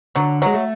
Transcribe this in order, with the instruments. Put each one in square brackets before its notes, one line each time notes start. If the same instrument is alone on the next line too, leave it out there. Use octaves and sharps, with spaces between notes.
[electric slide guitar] D3 [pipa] F#3
[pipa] F#3 [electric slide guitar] G#3
[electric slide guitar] A3